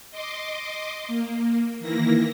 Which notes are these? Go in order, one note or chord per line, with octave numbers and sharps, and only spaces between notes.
D#5 C6 D6
A#3
D#3 E3 A#3 E4 A#6